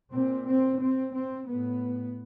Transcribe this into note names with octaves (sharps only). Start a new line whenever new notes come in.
A#2 C4
C4
C4
C4
A2 B3